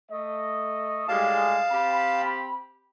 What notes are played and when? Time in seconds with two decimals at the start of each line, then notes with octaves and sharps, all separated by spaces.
0.11 A3 D#5
1.08 A2 G3 G#3 F5 A5
1.72 C4 G4 B5